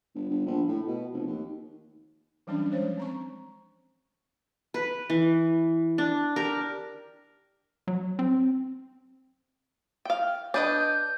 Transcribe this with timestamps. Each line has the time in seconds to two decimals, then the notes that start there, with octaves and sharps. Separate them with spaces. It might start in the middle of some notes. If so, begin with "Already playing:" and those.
0.15 G1
0.29 G1
0.46 A#1
0.68 A2
0.87 B2
1.13 F1
1.27 D#2
2.47 E3 F#3 G3 C#4 D4
2.70 F3 G#3 C5 C#5
2.97 C4 A#5 C#6
4.74 B4
5.10 E3
5.98 D4
6.36 G4 A#4
7.88 F#3
8.19 C4
10.05 F5 G5
10.54 D4 B4 D#5 G6